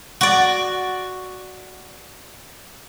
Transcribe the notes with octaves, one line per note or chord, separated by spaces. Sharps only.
F#4 D5